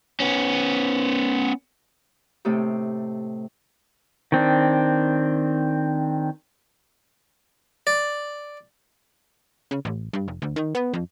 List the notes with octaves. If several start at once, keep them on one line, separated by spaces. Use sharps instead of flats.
B3 C#4
A2 C3 A3 D#4 G4
D#3 C4 D4
D5
C#3
A1
G2
F1
D2
D#3
B3
F2